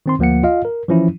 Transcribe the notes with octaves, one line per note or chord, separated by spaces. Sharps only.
D#3 C4 C6
D2 F3 A#3 F#5 C#7
F4 D#5 F5
A#4
E3 F3 C#4 E4